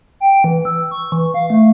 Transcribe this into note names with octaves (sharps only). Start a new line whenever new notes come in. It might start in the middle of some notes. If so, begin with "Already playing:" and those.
G5
E3
E6
C#6
E3
F5
A3